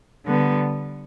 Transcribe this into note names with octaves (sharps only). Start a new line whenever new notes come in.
D3 G3 B3